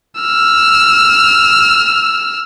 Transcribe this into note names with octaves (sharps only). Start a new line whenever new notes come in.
E6 F6